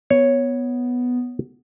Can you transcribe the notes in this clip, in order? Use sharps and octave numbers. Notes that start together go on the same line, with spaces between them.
B3 C#5